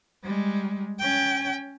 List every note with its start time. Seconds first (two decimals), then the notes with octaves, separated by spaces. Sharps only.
0.23 G3 G#3
0.99 C#4 G5